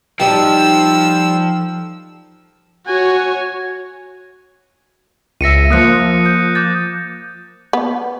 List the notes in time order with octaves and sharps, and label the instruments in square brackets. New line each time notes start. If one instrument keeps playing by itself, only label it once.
[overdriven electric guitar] F3 [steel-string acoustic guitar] G3 G5 [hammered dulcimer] D#4 A4 [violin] E6
[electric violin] F#4 C#5 [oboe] G#5
[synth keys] C#2 E5 [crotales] A#6 C#7 D#7
[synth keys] F3 A#3 [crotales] D#6 F#6 C#7
[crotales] G6
D6 G6 A6
[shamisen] B3